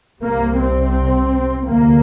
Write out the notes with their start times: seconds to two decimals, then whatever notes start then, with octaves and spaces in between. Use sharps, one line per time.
0.21 C2 C3 A#3
0.59 C4
1.68 D2 C3 A#3